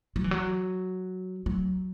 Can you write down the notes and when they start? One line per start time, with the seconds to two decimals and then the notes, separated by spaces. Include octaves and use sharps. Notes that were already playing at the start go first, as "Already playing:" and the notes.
0.16 F#3
0.24 E3
0.31 F#3
1.46 F#3